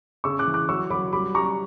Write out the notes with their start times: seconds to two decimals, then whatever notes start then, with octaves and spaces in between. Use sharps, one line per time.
0.24 C#3 C#6 E6
0.39 D6 F#6
0.47 E3
0.54 D6 F#6
0.69 F#3 C#6 E6
0.90 F#3 B5 D6
1.13 G3 B5 D6
1.35 G3 A#5 C#6